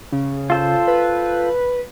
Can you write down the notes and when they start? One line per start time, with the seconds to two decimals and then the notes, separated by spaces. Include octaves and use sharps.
0.12 C#3
0.50 F4 A4 C5
0.87 B4